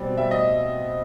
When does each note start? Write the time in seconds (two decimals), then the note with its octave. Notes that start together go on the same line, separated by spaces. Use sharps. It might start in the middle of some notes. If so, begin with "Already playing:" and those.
Already playing: B2 G3 C4
0.17 G3 E5
0.31 D#5